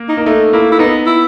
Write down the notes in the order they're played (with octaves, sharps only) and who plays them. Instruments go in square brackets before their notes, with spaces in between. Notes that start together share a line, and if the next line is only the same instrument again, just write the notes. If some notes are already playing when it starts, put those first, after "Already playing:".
Already playing: [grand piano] A#3
[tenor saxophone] D#4
[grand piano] A#3
[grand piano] A3 [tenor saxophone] D#4
[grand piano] A#3 [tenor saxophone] E4
[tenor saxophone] E4
[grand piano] B3 [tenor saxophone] D#4
[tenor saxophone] E4